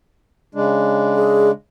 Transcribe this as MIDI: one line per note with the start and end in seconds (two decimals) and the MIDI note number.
0.55 1.51 49
0.55 1.51 56
0.55 1.51 62
1.16 1.49 68